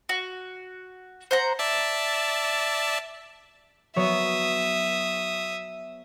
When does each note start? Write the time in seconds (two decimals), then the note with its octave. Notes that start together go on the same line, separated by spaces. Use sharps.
0.09 F#4
1.31 C5 F#5 A#5
1.59 D5 E5 A5
3.96 F#3 B3 C#5 E5 D#6